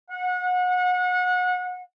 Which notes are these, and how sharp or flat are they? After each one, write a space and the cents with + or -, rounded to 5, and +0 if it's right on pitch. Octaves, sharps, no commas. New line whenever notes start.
F#5 -30